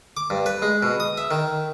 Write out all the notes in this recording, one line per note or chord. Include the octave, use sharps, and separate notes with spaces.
D6
G2
B4
G#3
B2
D#6
E5
D#3